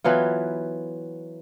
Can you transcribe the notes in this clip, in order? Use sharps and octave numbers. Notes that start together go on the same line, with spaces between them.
E3 F#3 B3 F4